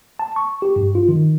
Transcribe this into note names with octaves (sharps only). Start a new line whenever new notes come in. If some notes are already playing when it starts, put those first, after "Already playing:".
A5
C#6
G4
G2
F4
D#3